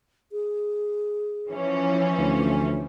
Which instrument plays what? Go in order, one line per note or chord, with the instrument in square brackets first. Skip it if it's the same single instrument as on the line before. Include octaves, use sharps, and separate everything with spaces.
[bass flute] G#4
[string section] E3 C#4 [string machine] F3
[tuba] D2 [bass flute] A3